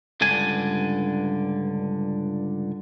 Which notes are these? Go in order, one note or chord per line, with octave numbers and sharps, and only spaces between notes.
C#2 G2 D3 D4 G#5